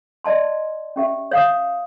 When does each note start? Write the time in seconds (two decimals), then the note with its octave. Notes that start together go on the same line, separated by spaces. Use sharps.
0.24 D5 D#5 A5 C6
0.96 C#4 G4 E5
1.31 C#5 F5 D#6